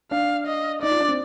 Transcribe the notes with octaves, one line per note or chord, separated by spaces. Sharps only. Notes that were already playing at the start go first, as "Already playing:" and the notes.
D4 F5
D#5
D#4 D5
F4
D4
C4